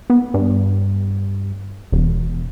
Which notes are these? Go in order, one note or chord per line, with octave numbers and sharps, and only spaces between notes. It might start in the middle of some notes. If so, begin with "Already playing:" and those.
B3
G2
E1